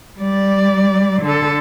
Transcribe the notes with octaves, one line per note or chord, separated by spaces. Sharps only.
G3 D5
D3 A4